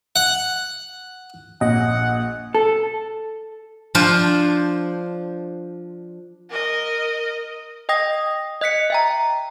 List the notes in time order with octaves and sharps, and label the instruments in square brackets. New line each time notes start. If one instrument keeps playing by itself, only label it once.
[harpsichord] F#5
[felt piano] A#1 [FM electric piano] D#5 [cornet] F#5
[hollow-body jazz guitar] A4
[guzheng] F3 D4 F4 C5
[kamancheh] A#4 D#5
[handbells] D#5 G5 D#6 A#6
D#5 F#6 B6 C#7
E5 G5 A#5